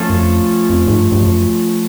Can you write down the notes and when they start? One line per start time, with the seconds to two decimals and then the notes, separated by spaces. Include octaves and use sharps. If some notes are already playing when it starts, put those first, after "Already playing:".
Already playing: F3 A3 C#4 F4 A4
0.10 F#2
0.17 F2
0.70 F2
0.88 G#2
0.97 G2
1.12 G2
1.23 F#2